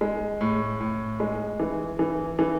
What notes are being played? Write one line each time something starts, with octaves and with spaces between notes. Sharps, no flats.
G#3
A2
A2
G#3
E3
E3
E3